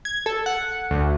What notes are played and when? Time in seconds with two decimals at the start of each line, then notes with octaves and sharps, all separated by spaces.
0.05 G#6
0.26 A4
0.46 F#5
0.90 D2